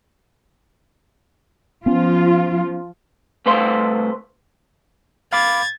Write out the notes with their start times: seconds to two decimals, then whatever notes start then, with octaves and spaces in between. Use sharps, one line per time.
1.86 F3 B3 C#4 F4
3.46 C2 A3 B4 C5 F5 C6
5.33 F5 B5 D6 G#6 A6